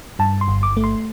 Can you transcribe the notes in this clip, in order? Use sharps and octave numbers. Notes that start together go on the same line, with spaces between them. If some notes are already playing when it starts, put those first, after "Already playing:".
G2 A5
C6
G1
D6
A3
C6